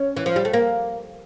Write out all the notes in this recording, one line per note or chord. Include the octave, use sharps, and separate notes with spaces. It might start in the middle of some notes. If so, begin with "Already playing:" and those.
Already playing: C#4
E3
F3
G3
A3
A#3